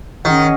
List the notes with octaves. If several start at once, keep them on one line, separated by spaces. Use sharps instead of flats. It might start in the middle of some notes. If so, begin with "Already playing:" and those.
D#3 C#4 G#4 D#5 F#5